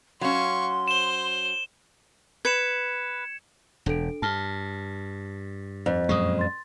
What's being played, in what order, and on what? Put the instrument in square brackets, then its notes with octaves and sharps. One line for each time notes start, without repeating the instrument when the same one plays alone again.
[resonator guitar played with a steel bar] F#3 C#4 [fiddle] F5 C#6 [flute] C6
[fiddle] C5 [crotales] E7 G7
[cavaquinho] B4 [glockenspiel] G#6 C#7 E7
[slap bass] E1 [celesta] D4 A4 D7
[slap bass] G2 [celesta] A5 F6 G7
[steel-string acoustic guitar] F2
[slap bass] F#2 A#2 G#3 [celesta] C#6 D#6
[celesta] C6 A6